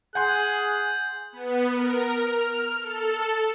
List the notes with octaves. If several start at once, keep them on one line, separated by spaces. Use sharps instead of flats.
G#4 F#5 G#5 C6 F#6 G6
B3
A#4
F6
A4